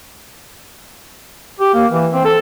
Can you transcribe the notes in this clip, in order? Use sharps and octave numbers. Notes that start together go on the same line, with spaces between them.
G4
A#3
E3
C4
A4